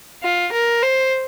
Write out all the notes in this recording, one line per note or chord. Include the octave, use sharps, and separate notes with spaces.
F4
A#4
C5